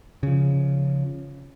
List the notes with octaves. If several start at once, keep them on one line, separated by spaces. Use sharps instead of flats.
C#3 F3